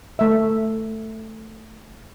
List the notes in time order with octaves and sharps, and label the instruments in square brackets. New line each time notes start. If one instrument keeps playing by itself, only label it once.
[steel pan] A3 E5